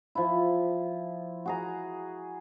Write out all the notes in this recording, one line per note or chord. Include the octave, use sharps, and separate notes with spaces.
F3 E4
F#4 G#4 A#5